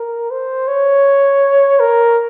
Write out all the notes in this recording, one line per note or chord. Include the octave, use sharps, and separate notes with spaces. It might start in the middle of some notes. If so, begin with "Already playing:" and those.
Already playing: A#4
C5
C#5
A#4